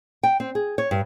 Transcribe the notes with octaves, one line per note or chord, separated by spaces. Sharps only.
G5
C4
G#4
C#5
G2